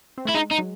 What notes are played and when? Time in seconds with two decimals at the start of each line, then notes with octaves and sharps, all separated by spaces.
0.18 C4
0.25 A3 E4
0.34 G#3 D#4
0.51 D#4
0.58 F#3